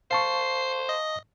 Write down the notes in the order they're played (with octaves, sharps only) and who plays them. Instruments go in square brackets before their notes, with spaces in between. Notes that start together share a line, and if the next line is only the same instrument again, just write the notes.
[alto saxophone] C5 [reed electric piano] F5 A5 C#6 [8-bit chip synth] C7
[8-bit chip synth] D#5